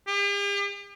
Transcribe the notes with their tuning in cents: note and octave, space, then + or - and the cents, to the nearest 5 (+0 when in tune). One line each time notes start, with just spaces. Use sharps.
G4 +45